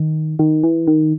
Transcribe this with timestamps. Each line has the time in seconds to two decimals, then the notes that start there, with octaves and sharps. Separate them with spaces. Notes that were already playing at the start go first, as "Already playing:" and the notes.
Already playing: D#3
0.39 D#3
0.64 E3
0.87 D#3